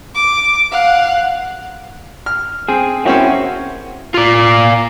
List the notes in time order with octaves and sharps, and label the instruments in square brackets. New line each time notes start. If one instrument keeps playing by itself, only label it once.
[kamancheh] D6
F5 F#5
[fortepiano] F6
[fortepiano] C4 [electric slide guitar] G#4
[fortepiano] A#3 C4 C#4 [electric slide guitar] E4 F#4 C#5
[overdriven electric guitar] F4 D5